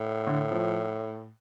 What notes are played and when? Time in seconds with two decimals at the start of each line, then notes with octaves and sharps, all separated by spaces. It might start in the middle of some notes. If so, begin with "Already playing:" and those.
Already playing: A2
0.27 D3
0.51 F3